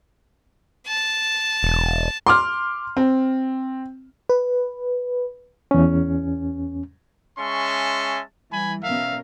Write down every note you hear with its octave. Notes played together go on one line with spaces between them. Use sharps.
A5
E1
C6 D6 F6
C4
B4
E2 C#4
G#3 C#4 E5 A5 C6 C#6
E3 G3 G#5 B5
B2 C#4 A#4 E5 F5